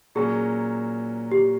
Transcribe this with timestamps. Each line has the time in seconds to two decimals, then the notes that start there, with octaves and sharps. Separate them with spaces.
0.15 A#2 F#3 A#3 C#4 G#4
1.32 G4